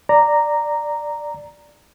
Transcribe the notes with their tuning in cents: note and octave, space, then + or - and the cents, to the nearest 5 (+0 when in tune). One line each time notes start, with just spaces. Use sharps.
D5 +5 A#5 -5